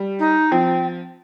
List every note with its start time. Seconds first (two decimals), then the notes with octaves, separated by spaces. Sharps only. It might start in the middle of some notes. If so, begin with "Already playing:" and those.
Already playing: G3
0.19 D#4
0.51 F3 C4